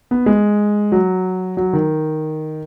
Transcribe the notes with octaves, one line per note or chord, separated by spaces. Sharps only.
B3
G#3
F#3
F#3
D#3